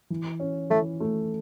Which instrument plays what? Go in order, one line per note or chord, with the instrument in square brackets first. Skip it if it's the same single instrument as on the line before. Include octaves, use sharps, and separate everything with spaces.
[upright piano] E3
C#4
[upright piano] E3 [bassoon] A3
[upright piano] A3